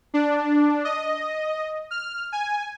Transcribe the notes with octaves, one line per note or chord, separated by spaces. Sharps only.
D4
D#5
F6
G#5